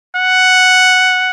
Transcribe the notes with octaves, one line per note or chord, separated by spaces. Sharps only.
F#5